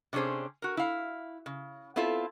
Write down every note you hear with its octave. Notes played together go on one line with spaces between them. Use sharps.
C3 C#4 D4 G#4 C5
F#4 A#4
E4 F5
C#3
B3 C4 E4 F4 A4